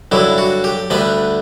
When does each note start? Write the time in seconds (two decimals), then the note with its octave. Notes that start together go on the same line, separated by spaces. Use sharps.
0.11 G2 D3 F#3 E4
0.38 F#4
0.64 G4
0.90 D2 D3 G3 B4